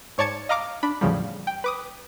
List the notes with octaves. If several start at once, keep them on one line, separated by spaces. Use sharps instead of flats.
G#2 C#5 D5 A5 G#6 C#7
D#5 F5 A#5 D6 F6
D4 B5
E2 A2 C#3 F3 G3
G5
B4 D6 D#6